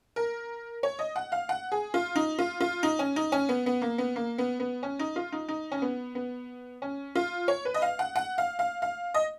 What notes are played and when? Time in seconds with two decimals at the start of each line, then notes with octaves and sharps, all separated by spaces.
0.16 A#4
0.83 C#5
0.99 D#5
1.16 F#5
1.32 F5
1.49 F#5
1.72 G#4
1.94 F4
2.16 D#4
2.39 F4
2.61 F4
2.83 D#4
2.99 C#4
3.16 D#4
3.32 C#4
3.49 B3
3.66 B3
3.82 A#3
3.98 B3
4.16 A#3
4.38 B3
4.60 B3
4.83 C#4
4.99 D#4
5.16 F4
5.32 D#4
5.48 D#4
5.72 C#4
5.82 B3
6.15 B3
6.82 C#4
7.16 F4
7.48 C#5
7.65 B4
7.74 D#5
7.82 F5
7.99 F#5
8.16 F#5
8.38 F5
8.59 F5
8.82 F5
9.14 D#5